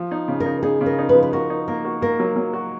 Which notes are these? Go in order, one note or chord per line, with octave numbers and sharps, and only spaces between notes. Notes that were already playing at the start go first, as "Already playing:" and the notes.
Already playing: F3
D#4
C#3
A#4
D#4
D#4 G#4
C#3
A#4
D#4
B4
F3
B4
F#4 A#4
D#4
A#3 A#4
F#4
A#3 A#4
F#3
F#3
F#4